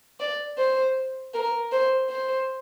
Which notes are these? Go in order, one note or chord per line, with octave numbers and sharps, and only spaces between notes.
D5
C5
A#4
C5
C5